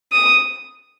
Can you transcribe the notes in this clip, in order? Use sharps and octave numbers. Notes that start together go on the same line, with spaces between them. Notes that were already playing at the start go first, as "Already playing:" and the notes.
D#6